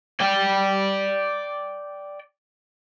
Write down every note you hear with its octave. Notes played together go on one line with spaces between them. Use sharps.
D5 G5